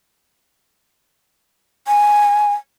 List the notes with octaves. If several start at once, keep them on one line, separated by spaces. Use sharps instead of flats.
G#5